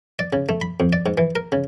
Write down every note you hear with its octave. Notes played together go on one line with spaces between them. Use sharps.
D5
C#3
A3
B5
F2
D5
G#2
E3
A#4
C#3